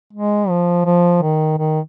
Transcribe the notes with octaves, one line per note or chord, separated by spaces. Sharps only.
G#3
F3
F3
D#3
D#3